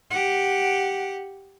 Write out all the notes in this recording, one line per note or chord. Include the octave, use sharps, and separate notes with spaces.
G4 F#5